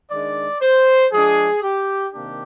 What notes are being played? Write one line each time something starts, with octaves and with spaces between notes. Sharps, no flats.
D#3 G#3 D4 D5
C5
F3 G#3 D4 G#4
G4
C3 D#3 A#3 D4 G4